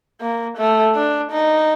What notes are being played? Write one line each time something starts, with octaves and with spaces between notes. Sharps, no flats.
A#3
A3
D4
D#4